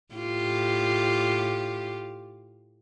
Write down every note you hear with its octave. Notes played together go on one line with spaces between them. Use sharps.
A2 F4 G4